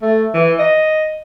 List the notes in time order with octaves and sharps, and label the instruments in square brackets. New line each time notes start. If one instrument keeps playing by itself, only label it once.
[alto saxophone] A3
E3
D#5